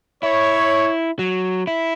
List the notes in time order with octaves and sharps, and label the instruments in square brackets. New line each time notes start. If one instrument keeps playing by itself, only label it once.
[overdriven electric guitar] E4 [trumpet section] C#5
[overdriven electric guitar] F#3
E4